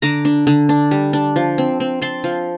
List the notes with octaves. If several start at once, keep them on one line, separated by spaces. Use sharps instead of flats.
D3 A#5 D6
D4
D3
D4
G3
D4
F3
C4
C4
C4 A5 C6
F3